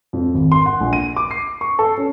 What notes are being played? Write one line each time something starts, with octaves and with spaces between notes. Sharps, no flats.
F2
G#1
C6
F#5
A#1
D#7
D6
C7
C#6
A4
C#4